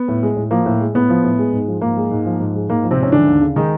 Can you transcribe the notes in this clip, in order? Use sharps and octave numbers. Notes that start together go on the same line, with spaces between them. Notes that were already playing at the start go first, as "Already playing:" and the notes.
Already playing: B3
A2
G#3
A2
F3 A#3
A2
G#3
A2 B3
F3
A2
G#3
G#2
F3
G#2 A#3
G#3
G#2
F3
G#2
G#3
G#2 A#3
F3
C3 C4
G#2 C#4
D3 E3 D4
D#2
C#3
D#3 G#3 D#4